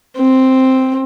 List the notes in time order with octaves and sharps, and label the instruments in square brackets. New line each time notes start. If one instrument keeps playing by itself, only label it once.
[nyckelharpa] C4